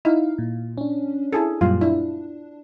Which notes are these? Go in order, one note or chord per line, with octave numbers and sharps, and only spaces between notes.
D#4 E4 F5
A#2
C#4 D4
E4 G#4 A4
F#2 A#2 G3 F4 F5
D4 E4